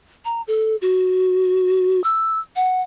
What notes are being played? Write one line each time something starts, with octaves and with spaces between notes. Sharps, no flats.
A#5
A4
F#4
E6
F#5